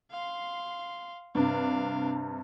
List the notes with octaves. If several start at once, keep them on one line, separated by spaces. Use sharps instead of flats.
F5 C6
G2 C3 D4 F5